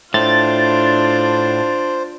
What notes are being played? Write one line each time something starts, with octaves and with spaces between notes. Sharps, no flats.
A2 D4 F4 C5 A6